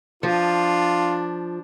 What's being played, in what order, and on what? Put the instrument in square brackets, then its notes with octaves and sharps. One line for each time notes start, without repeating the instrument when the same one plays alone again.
[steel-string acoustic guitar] F3 [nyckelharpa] D4 [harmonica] F4